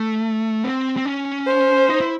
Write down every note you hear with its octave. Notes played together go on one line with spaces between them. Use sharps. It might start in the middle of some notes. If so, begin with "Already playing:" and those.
Already playing: A3
C4
C4
C#4
C5
D#4
E4